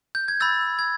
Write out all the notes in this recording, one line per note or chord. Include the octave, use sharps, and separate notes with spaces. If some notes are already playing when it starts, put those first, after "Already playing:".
G6
G#6
B5 E6 G6 A6
G#6